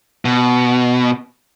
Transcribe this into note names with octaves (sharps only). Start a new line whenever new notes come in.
B2